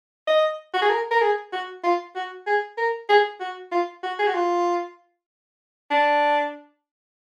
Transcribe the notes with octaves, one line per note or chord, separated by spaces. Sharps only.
D#5
F#4
G#4
A#4
A#4
G#4
F#4
F4
F#4
G#4
A#4
G#4
F#4
F4
F#4
G#4
F#4
F4
D4